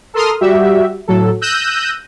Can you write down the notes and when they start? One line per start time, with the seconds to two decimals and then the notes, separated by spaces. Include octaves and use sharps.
0.14 A4 A#4 C6 D#6 F6
0.41 G3 F#4 G4 E5
1.08 A2 F#3 A4
1.41 E6 F#6 G6 A#6 D#7